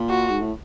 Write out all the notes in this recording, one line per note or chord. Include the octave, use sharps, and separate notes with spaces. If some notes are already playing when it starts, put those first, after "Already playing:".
Already playing: A#2
F#4
G#2
A2